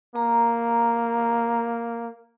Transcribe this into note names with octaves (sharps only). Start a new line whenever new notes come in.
A#3 A#5